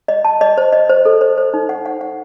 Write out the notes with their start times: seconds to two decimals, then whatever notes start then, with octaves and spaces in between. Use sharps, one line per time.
0.08 D#5
0.25 A5
0.41 D#5
0.58 C5
0.72 D#5
0.89 C5
1.05 A4
1.21 C5
1.38 C5
1.54 D#4
1.69 F#5
1.86 F#5
2.01 F#5